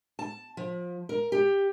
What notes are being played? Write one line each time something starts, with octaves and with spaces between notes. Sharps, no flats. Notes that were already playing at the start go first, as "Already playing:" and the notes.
A5
F3
A#4
G4